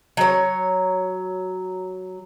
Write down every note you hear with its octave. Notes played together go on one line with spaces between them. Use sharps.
F#3 C#5